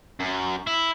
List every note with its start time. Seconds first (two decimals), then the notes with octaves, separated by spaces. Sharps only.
0.20 F#2
0.67 E4